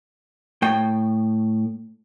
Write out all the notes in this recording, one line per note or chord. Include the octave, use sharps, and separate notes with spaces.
A2 G5